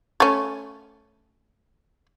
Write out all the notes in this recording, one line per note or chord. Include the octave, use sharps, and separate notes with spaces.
A3 C#4